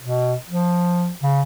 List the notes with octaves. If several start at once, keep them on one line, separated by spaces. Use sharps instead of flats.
B2
F3
C#3